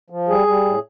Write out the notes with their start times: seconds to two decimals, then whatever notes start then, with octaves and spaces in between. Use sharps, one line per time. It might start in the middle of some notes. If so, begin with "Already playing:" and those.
0.10 F3
0.28 G3 G#4
0.47 G3
0.65 A2